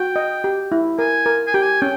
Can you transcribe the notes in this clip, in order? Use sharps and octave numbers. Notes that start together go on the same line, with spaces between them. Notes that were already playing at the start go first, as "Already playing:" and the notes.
Already playing: F#4 G5
D#5
G4
E4
A#4 G#5
A#4
G#5
G4 G5
G#5
C#4 G5